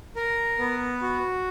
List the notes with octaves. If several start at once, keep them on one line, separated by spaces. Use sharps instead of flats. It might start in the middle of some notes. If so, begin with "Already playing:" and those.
A#4
B3
F#4